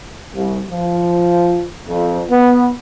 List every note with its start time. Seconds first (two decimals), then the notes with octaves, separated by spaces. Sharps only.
0.34 C2
0.70 F3
1.87 F2
2.29 B3